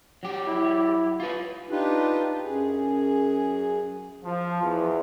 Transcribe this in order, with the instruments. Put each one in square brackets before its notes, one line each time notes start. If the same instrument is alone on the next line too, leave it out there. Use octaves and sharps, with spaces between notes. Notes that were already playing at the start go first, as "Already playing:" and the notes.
[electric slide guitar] F#3 G4
[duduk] E4
[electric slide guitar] F4 B4
[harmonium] D4 D#4 F4 G4 B4
F#2 G#4
[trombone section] F3
E2